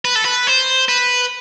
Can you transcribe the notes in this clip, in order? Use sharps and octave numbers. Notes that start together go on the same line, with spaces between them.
B4
A4
B4
C5
B4